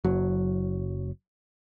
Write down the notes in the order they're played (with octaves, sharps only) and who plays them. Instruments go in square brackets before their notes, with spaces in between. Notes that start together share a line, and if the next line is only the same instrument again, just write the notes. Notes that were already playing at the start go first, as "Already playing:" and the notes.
[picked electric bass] F#1 F#3